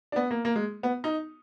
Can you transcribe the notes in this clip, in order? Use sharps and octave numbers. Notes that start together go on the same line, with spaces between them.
D4
B3
A#3
A#3
G#3
B3
D#4